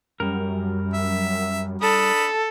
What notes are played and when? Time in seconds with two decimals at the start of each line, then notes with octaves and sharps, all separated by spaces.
0.20 F#2 G3 A#4
0.94 E5
1.82 D4 A4 B5 D#6